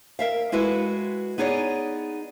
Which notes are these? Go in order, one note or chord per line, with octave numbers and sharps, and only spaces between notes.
A#4 E5 F5
G#3 E4 F#4 A4 B4
B3 D#4 G#4 C#5 D5